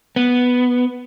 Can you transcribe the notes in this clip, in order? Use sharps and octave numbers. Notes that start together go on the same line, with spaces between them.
B3